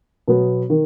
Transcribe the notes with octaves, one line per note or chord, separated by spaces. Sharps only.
B2 F#3 B3
D#3